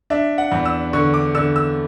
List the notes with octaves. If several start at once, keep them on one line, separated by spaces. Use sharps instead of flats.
D4 E5
F#5
E2
E6
D3 C#6
D6
D3 E6
E6